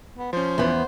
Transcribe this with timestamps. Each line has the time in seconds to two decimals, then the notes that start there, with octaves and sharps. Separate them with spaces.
0.18 B3
0.33 F3 C#4 C5
0.58 E2 B3